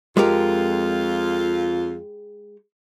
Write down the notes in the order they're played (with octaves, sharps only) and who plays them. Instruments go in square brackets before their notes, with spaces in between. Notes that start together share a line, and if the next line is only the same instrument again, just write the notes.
[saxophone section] F2 F4 [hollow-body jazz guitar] G#3 G4 A#4